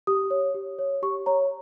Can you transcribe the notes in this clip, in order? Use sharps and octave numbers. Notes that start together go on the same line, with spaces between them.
G4 D#6
C#5
G4
C#5
G4 C#6
C#5 A#5